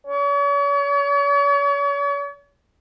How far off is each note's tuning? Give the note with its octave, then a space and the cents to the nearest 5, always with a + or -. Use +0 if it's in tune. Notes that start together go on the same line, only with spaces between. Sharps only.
C#5 +40